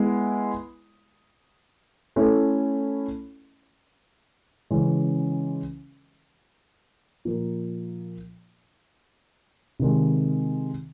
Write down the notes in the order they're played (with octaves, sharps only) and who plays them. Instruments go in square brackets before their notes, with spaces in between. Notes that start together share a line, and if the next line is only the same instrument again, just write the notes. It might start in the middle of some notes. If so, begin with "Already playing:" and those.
Already playing: [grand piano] G#3 B3 E4
A3 C#4 E4 A4
C#3 E3 G#3 C#4
A#2 F3 A#3
C3 D#3 G#3